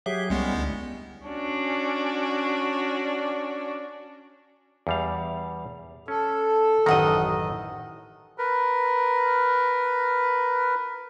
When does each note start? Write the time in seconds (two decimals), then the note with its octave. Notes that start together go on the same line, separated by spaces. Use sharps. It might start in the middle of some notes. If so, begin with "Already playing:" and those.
0.06 F#3 G4 G#4 E5
0.30 C2 G3 G#3 B3 C#4
0.54 D2
1.26 C#4 D4 F#4
4.87 E2 G3 F5
6.08 C#4 A4
6.86 A1 F#2 D#3 D#5 F#5 A#5
8.38 A#4 B4